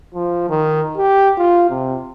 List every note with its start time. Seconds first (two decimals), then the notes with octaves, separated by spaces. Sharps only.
0.14 F3
0.49 D#3
0.97 G4
1.38 F4
1.69 C3